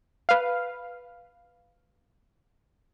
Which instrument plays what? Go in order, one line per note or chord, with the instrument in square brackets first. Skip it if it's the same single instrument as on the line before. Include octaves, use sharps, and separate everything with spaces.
[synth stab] B4 F5